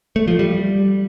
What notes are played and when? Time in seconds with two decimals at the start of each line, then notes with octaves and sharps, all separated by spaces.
0.16 A3
0.28 F3
0.39 G3